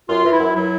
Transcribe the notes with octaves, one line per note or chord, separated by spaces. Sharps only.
F#2 F4
E3
E4
F#2
F#3 E4